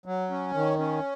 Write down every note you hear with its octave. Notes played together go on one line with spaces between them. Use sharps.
F#3
C#4
D#3
C#4